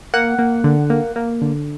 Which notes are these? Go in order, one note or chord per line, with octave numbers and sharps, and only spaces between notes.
A#3 F#5
A#3
D3
A#3
A#3
D3